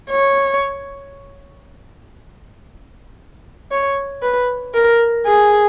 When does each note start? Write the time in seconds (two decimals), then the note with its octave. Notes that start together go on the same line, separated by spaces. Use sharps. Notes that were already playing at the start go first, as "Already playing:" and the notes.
0.10 C#5
3.71 C#5
4.22 B4
4.74 A#4
5.26 G#4